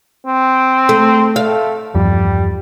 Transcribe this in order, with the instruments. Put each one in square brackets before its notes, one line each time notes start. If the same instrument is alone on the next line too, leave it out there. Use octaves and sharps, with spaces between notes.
[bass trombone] C4
[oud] A3
[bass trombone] A3 [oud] F5
[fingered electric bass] E2 G2 F3 [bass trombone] G3